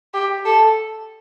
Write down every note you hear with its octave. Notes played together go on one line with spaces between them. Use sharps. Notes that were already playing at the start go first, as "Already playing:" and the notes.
G4
A4